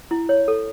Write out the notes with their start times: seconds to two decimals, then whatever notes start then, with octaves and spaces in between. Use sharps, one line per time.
0.11 E4
0.29 C#5
0.48 A4